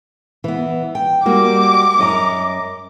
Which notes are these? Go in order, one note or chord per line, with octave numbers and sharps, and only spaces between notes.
E3 B3
G5
G3 A#3 F#4 D6
F#2 D#5 A#5